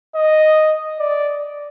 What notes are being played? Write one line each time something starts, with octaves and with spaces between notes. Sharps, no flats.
D#5
D5